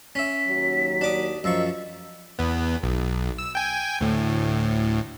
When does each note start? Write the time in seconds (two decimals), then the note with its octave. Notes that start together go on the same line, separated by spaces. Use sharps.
0.15 C#4 E5 B6
0.48 D#2 F#3
1.01 D4 D6 D#6
1.44 F#2 F3 A#4 C5 D#5 C#6 E6
2.39 E2 B3
2.84 B1
3.38 E6
3.55 G5 G#5
4.01 D2 A2